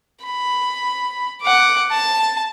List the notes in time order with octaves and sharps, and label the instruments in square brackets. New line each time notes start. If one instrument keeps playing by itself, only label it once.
[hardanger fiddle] B5
F#5 D6
A5